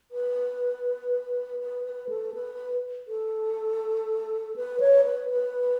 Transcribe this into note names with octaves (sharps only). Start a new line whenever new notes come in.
B4
B4
B4
A4
B4
A4
B4
C#5
B4
B4